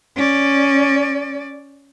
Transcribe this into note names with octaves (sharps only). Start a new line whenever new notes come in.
C#4 D5